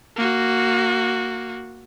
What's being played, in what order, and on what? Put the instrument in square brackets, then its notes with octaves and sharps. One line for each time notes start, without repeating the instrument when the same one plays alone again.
[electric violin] A#3 F#4